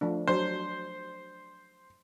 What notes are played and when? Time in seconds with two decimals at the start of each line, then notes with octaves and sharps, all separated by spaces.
0.01 F3 A3 D4
0.28 F#3 D4 C5